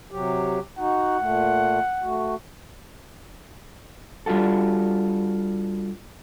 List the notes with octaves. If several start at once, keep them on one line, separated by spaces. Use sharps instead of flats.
C3 F#3 G4
D#4 F#4 F#5
A#2 A3
A3 F#4
G3 D4 F4 F#4 A4